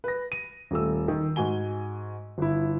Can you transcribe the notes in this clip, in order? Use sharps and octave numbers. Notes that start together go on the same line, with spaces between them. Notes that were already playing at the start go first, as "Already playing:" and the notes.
B4 A#6
D#7
D#1 A3 E6
D#3
G#2 F#4 G#5 G7
G1 E4